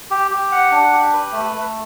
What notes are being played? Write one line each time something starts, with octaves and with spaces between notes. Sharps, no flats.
G4
G4
F#5
D4
G4
B4
A3
A3